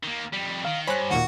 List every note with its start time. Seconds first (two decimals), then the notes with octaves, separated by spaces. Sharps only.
0.03 D#3 A#3
0.33 F2 G3
0.65 D#3 F5
0.87 G2 C5 C#5 G#5 B5 F#6
1.11 D#2 A#2 F#4